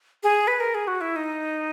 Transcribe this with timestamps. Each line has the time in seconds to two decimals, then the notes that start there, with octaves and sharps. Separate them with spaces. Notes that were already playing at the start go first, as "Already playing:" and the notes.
0.23 G#4
0.48 B4
0.60 A#4
0.75 G#4
0.87 F#4
1.01 E4
1.16 D#4